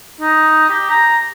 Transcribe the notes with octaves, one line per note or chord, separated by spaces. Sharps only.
D#4
G4
A#5